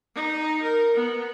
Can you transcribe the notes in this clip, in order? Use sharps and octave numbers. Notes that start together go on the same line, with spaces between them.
D#4
A#4
B3